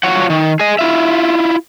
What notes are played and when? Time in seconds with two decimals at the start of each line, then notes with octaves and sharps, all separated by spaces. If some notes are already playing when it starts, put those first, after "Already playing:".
0.03 F4 F#4 C#5 F#5
0.30 D#3
0.60 G#4 D#5
0.79 E4 F4 E5